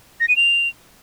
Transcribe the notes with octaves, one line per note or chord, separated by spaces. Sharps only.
A#6
D#7
F7